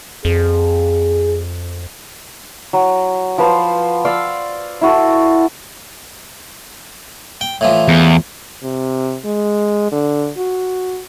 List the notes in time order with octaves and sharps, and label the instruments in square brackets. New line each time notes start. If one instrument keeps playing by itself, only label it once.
[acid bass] F2 [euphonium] G#4
[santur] F#3
F3 B4 C5 F5
D5 F5 C6 E6
E4 F#4 A4
[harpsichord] G5
A2 E3 F3
[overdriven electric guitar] E2
[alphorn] C3
G#3
D3
F#4